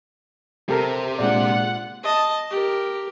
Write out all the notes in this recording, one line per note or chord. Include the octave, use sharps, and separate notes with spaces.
C3 G4 A4 A#4
A#2 G#3 D4 F4 D5 F#5
D#5 A5
G4 A#4